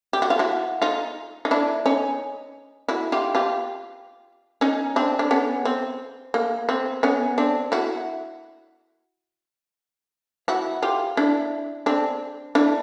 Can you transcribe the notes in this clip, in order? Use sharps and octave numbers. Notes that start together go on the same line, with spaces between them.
G4
F#4
F4
E4 F#4
D#4 F4
D#4
D4 E4
C#4 D#4
E4 F#4
F4 G4
F4 G4
C#4 D#4
C4 D4
D4
B3 C#4
C4
A#3
C4
B3 C#4
C4 D4
E4 F#4
E4 F#4
F4 G4
D4 E4
C4 D4
D4 E4